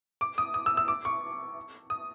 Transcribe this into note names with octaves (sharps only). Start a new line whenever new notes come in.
D6
D#6
D#6
E6
E6
D6
C#6
D#6